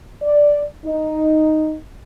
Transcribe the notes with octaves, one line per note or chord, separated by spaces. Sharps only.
D5
D#4